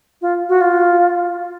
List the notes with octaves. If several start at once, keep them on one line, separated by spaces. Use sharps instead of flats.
F4
F#4
F4